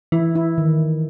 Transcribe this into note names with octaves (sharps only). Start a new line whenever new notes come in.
E3 E4
E4
D#3